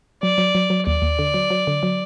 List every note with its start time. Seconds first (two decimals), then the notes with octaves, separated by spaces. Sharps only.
0.22 F#3 D5
0.38 F#3
0.55 F#3
0.70 F#3
0.86 D#2 D5
1.02 D#2
1.19 D3
1.34 F#3
1.50 F#3
1.67 D3
1.83 F#3